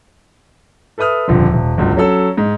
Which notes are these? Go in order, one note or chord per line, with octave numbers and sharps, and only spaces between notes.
A4 B4 E5 D#6 F6
D#1 F2 D3
D#1
G1 C#2 F#3
F#3 C#4 A4 E6
G#2